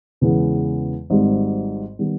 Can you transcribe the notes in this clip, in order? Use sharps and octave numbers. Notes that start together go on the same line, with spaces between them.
E2 C#3 E3 G#3 B3
G#1 G#2 G3
D#3 G3 B3